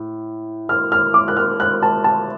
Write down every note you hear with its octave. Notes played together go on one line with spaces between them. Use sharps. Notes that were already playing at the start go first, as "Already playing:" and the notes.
Already playing: A2
F6
F6
D6
F#6
F6
F#6
A5
A5